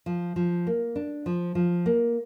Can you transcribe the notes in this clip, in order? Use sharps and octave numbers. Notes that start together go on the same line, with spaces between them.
F3
F3
A#3
D4
F3
F3
A#3